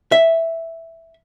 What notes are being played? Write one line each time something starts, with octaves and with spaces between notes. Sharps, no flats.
E5